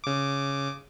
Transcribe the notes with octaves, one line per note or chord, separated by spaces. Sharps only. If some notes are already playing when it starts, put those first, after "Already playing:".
C#3 D6